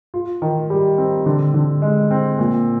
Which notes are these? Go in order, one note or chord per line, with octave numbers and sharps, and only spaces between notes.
F4
D#3
G3
C4
D3
D3
G#3
C4
A#2